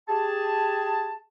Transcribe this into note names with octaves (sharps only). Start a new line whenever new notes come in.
G4 G#4 A5